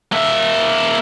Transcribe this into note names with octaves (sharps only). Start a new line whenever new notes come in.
A#3 E5